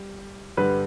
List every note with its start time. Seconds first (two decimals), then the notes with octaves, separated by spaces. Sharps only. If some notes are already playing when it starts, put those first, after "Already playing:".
Already playing: G3
0.57 G2 D3 G3 B4